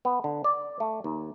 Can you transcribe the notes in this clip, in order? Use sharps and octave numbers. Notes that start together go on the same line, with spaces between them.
B3
D3
D5
A3
D#2